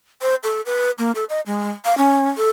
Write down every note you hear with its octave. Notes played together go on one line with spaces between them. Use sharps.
C5
A4
B4
A#3
A4
D#5
G#3
F5
C#4
A4